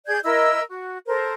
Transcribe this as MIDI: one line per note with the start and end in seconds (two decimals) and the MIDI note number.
0.06 0.19 68
0.06 0.19 74
0.06 0.19 91
0.06 0.19 92
0.23 0.60 64
0.23 0.60 70
0.23 0.60 75
0.23 0.60 88
0.69 0.97 66
1.07 1.34 69
1.07 1.34 70
1.07 1.34 72